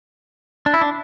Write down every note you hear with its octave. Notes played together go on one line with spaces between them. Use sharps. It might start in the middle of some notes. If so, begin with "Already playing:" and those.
D4
E4
D4